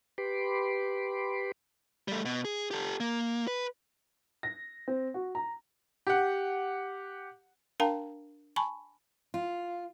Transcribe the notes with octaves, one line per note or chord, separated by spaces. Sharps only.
G4 B4 B5 C6 D6
G3 A3
B2
G#4
G4 A4
A#3
B4
A#6
C4
F#4
A#5
G4 F#5
D4 A#4 F5 G5 A5 A#5
G#5 A5 B5 C#6
F4